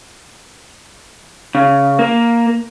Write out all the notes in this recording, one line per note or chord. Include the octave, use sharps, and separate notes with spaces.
C#3
A#3